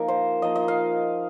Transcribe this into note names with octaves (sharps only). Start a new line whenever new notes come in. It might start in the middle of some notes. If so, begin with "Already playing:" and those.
Already playing: F3 A#3 D#4 F4 A#4
C5
F3 A#3 D#4 D#5
D#5
F5